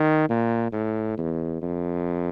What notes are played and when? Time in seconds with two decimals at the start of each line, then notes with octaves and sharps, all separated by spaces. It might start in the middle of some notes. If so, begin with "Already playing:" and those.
Already playing: D#3
0.29 A#2
0.72 A2
1.17 E2
1.61 F2